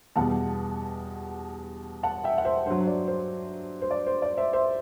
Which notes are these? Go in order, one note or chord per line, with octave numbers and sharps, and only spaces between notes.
E2 B2 G3 F#5 A5
F#5 A5
E5 G5
F#5
C5 E5
G2 F#3 C5
D5
C5
C5
D5
C5
D5
C5 E5
C5 E5